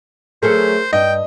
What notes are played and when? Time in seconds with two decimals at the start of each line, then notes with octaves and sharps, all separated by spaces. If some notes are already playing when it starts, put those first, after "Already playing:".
0.42 F#3 A3 G#4 A#4 C5
0.93 G2 D#5 G5